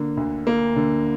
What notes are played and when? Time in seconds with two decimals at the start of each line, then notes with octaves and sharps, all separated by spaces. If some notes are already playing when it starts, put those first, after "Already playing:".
Already playing: D3 A#3
0.17 D2
0.47 A#3
0.76 D3